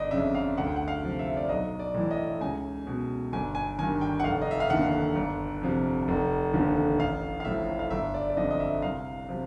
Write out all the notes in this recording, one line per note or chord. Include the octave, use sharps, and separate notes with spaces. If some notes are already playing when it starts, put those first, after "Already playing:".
Already playing: G1 D5 D#5
F2 C#3 E5
F5
D2 F#5
G5
F#5
F5
C3 F3
E5
D5
B1 D#5
D5
A2 E3
D#5
C#2 G#5
B2
G1 G#5
G#5
G2 D#3 G#5
G5
F#5
F1 F5
D#5
E5
F5
D#2 D3 F#5
G1
F2 C3 F3
F1
D#2 D3 F3
A1 F5
F5
A2 F3 E5
F5
G1 E5
D5
D5
F2 D3 F3 D#5
D#5
E5
C2 F5
C3 F3